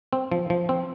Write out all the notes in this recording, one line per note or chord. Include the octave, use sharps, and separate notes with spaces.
C4
F3
F3
C4